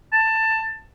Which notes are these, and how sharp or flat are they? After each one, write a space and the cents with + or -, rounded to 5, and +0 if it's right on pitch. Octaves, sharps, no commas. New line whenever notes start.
A5 +15